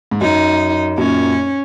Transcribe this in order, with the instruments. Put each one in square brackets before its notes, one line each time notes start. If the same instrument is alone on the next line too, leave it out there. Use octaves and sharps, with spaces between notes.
[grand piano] G#2
[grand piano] F#2 [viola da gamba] D#4
[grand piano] F#2 A#2 [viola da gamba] C#4